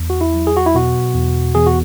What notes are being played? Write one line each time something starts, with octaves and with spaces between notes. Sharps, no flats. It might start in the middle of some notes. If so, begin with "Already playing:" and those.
Already playing: E2
F#4
E4
F#3
G#4
F#4
E4
B2 F#4
E2
E2 G#4
F#4